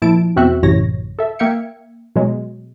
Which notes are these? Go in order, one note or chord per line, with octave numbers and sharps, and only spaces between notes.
A#2 F3 E4 A5 D7
E2 B2 C4 F#4 E5 F#6
A1 F#2 A2 C3 C#5 A#6
A4 E5
A#3 E5 F5 G5 G#6 C#7
B2 F#3 G#3